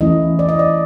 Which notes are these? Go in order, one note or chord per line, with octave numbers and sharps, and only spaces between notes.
E3 A3 C#4 E4 D#5
D5
D#5
D5